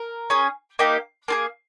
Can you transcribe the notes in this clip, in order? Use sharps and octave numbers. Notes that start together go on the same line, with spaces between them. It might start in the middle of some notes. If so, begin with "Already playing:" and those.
Already playing: A#4
C#4 G#4
A#3 D#4 G4
A#3 F4 G#4